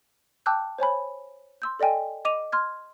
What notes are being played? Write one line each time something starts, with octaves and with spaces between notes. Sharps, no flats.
G5 A5 D6 E6 F#6 G6
C5 C#5 G#5 B5
C6 E6 G6
A4 D5 D#5 G5 G#5
D#5 D6 D#7 F7
C6 F6 G#6